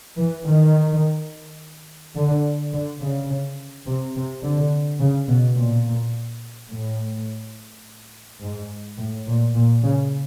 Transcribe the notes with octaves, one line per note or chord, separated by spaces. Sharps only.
E3
D#3
D3
D3
C#3
C3
C3
D3
C#3
B2
A#2
A2
G#2
A2
A#2
A#2
C#3